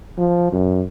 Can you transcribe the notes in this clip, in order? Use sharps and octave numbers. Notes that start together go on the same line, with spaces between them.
F3
F#2